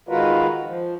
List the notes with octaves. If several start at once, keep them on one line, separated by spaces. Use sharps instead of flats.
D#3 G#3 F4 F#4 A#4 B4
F3